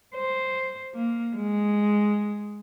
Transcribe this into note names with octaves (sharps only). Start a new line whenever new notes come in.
C5
A#3
G#3